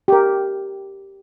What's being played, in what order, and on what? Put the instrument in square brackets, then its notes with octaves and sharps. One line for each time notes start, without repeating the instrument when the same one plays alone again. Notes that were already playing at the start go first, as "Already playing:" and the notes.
[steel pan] G4 A#4